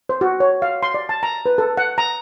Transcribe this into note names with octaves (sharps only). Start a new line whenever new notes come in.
C5
F#4
C#5
F5
C6
D5
A5
A#5
B4
A4
F#5
A#5